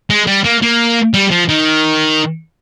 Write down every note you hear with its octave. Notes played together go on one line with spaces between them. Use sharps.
G#3
G3
A#3
A#3
G3
F3
D#3